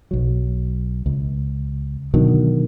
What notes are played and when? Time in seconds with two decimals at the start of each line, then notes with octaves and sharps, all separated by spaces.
0.11 B1 F#3
1.06 C#2
2.14 B2 D3 D#3 F#3